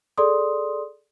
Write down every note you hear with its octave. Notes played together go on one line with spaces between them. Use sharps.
G#4 A4 D5 C6 D#6